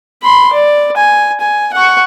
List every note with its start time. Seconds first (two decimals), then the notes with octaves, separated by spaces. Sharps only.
0.23 B5 C6
0.53 D5
0.97 G#5
1.41 G#5
1.73 F#5 C#6